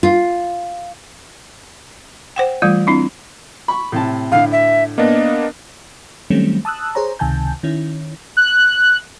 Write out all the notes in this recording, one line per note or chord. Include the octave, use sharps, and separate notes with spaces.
F4
C5 F#5 G5
E3 G3 A3 F4
C4 D4 E4
B5 C#6
A2 C3 A5
A2 D3 F5
E5
A#3 B3 D4 D#5
D#3 F#3 G3 A3 C4 C#4
A5 D#6 E6 F#6
G#4 C5 C#5 A#5
C#2 C3 D#3 G#5 A5 G6
D#3 C#4 E4
F#6